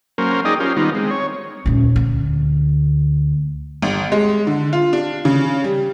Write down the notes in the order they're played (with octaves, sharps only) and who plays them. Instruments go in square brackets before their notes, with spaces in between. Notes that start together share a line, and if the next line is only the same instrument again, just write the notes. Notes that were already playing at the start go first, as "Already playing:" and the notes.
[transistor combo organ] F#3 A#3 C#4 A#4 C5
D#4 G#4 D5 D#5 G5
C#4 F4 G4 A#4 C5
D#3 G3 B3 D#4 F4
G#3 C4
C#5
[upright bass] D#1 C#4
D2
[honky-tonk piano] G1
G#3
D3
F4
D4
C#3
G3